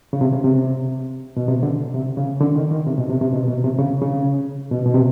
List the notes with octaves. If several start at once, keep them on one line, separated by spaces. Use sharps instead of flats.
C#3
C3
C#3
C3
B2
C3
D3
C3
C#3
D3
D#3
D#3
C3
B2
C3
C3
B2
B2
C3
C#3
C#3
B2
B2
C3